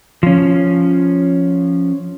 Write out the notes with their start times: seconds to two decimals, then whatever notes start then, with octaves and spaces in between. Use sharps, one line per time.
0.23 F3 C#4